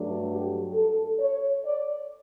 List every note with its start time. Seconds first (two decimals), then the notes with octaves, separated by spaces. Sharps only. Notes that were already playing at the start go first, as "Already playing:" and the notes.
Already playing: G2 F#3 A3 D4
0.28 G4
0.73 A4
1.19 C#5
1.65 D5